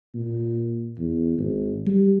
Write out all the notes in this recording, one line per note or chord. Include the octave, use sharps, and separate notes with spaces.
A#2
E2
G#1
G3